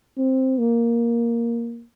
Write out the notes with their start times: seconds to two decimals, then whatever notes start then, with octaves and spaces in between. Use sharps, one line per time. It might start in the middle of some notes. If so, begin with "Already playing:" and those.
0.18 C4
0.58 A#3